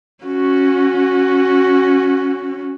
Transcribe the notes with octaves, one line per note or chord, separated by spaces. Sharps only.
C#4 F#4